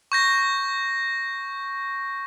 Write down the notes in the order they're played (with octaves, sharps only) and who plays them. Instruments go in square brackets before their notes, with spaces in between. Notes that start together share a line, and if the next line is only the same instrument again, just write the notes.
[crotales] C#6 G6 A#6